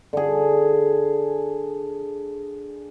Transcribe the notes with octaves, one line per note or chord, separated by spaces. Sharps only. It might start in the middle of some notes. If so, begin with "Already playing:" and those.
D3 G#4